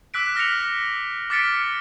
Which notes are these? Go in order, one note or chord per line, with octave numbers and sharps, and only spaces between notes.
D6 E6 F#6 B6 D7
F6 A#6 B6 C#7 F7
D6 F6 A6 B6 C#7 D7